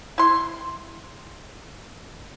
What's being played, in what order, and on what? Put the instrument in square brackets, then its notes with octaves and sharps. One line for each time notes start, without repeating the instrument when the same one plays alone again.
[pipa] E4 C6